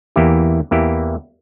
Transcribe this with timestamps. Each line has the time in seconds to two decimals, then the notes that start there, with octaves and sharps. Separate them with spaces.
0.16 E2 E3 A#3 E4 G4
0.71 E2 E3 A#3 E4 G4